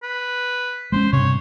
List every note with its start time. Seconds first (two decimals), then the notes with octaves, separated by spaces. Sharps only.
0.03 B4
0.92 G#3 A3 C#4 C5
1.13 G2 C3 C#5